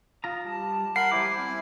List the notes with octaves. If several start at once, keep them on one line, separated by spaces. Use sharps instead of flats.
F4 A#5 D#6
G3 A5
A#4 F#5 B5 C7
G3 E4 C5 G#5 D6
C4